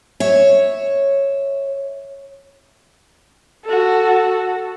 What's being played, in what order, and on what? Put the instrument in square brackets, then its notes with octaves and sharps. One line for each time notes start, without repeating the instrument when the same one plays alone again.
[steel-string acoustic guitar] C#5 E5
[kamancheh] F#4 A4